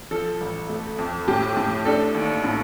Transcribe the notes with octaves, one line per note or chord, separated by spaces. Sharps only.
F3 A4
A1
A3
F2
A2 G4
A2
D4 A4
D#2
A2